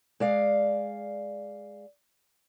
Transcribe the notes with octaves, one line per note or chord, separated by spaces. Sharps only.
G#3 D5 F5